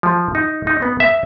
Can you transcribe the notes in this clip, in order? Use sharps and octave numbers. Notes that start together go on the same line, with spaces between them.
F3
D#4
D#4
B3
E5